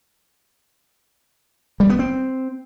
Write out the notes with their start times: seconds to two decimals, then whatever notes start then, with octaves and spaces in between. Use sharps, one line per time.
1.80 G3
1.90 B3
1.99 C4